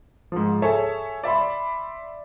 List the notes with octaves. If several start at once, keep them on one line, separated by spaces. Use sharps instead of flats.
G#2 F3
G#4 A4 C#5 E5
D5 E5 B5 C6